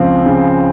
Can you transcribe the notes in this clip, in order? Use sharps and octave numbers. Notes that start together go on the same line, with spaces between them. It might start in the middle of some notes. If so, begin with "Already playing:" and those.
Already playing: C#2 F3 C4
C#3